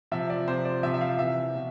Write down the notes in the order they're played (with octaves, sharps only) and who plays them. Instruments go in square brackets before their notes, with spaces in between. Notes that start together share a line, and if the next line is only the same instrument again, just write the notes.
[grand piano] C3 F3 E5
D5
C3 F3 C5
D5
C3 F3 E5
E5
F5
C3 E3 E5
B2